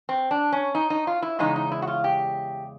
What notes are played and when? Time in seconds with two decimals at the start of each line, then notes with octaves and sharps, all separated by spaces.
0.09 C4
0.31 D4
0.52 C#4
0.75 D#4
0.90 D#4
1.07 F4
1.22 E4
1.39 E2 C#3 G#3 D#4
1.56 D#4
1.72 E4
1.82 F#4
1.87 F4
2.04 G4